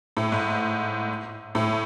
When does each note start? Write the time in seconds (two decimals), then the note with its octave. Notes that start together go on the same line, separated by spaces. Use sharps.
0.17 A2
0.32 G#2
1.55 A2